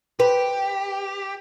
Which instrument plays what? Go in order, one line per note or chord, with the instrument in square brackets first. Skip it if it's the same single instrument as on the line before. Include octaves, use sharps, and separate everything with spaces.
[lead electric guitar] G4 [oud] B4